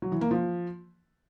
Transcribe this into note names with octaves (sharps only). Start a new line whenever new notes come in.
F#3
E3
A#3
F3